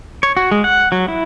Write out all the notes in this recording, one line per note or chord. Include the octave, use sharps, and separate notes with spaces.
C#5
F#4
G#3
F#5
F#3
E4